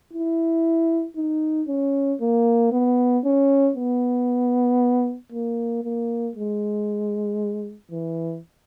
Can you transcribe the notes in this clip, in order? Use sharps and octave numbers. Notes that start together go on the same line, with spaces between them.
E4
D#4
C#4
A#3
B3
C#4
B3
A#3
A#3
G#3
E3